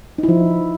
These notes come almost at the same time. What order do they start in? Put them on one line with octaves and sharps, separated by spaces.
D#4 E4 F3